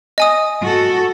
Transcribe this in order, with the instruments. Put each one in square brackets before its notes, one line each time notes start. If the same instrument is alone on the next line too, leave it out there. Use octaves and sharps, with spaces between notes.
[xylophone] D#5 G#5 D#6
[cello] F#4 A4